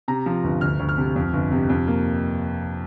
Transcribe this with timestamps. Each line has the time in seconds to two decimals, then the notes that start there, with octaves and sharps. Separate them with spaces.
0.08 C3 A#5
0.26 F3
0.44 G1
0.61 D2 F6
0.79 D2
0.89 F6
0.97 C3
1.16 F2
1.33 G1
1.52 C3
1.69 F2
1.88 A#3